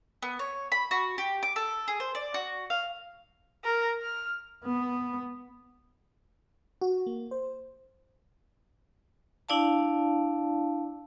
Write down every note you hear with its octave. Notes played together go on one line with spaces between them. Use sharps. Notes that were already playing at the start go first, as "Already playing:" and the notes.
B3
C#5
B5
F#4
G4
D6
A4
G#4
C5
D5
F#4
F5
A#4
F6
B3
F#4
A#3
C5
D4 E4 D5 F5 A5